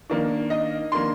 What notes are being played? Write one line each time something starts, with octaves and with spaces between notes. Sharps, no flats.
D#3 A#3 D4
D#5
D#3 A#3 D4 C6